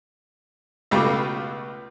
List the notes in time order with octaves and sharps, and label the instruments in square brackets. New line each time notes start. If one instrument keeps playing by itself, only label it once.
[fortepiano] C#2 B2 A3 F4 G4